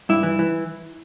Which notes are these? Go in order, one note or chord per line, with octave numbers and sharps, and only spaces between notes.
G2 E4
E3
E3